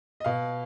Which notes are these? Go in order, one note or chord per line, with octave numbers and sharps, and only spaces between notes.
D#5
B2 F5